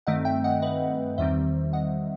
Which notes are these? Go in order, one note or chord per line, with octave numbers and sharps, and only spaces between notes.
G2 D#3 A3 C4 D#5 F#5
E5 G5
D#5 F#5
B4 D#5
E2 D#3 G3 C4 C5 E5
D#5 F#5